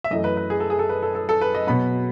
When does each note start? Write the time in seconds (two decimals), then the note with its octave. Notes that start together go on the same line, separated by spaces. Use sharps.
0.04 E5
0.11 F#2 E3 A3 D#5
0.24 B4
0.37 B4
0.50 G#4
0.60 A4
0.70 G#4
0.79 A4
0.89 B4
1.02 A4
1.15 A4
1.29 A4
1.41 B4
1.55 D#5
1.67 B2 F#3 B3 B5